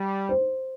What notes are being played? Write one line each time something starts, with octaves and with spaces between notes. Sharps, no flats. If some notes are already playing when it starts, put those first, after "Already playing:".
Already playing: G3
C5